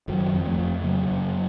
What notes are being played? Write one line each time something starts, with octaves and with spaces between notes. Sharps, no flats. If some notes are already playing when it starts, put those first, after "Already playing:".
F#1 D#3 F#3
F2
F3 A3
F2
C#3 F#3 A#3
F#1